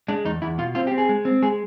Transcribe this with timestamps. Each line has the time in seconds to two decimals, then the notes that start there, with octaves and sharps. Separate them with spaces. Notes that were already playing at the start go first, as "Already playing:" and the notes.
0.08 G#3 D4
0.25 E2 D#4
0.42 E2 E4
0.58 B2 F4
0.75 C4 F4
0.87 G4
0.92 C4
0.98 G#4
1.09 G#3
1.25 C4
1.42 G#3 G#4